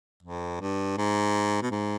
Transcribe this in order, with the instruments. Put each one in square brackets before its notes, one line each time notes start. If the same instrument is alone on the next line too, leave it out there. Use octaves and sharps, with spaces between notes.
[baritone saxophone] F2
G2
G#2
B2
G#2